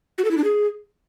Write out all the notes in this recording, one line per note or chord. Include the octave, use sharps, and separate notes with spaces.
F#4
A4
E4
D4
G#4